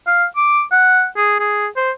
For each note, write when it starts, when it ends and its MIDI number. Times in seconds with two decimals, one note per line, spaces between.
0.07 0.25 77
0.37 0.63 86
0.72 1.06 78
1.17 1.39 68
1.40 1.67 68
1.76 1.91 72